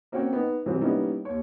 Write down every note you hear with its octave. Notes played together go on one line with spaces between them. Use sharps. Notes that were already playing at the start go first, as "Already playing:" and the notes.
A#3 C4 C#4 F#4 C#5 G5
B3 D#4
G#2 C3 E3 F#3 G3 C4
G3 A#3 B3 C#4 D#4 E4
D#2 C#5